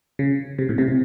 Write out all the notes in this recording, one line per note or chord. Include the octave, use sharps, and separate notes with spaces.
C#3
C3
A2
C3
C3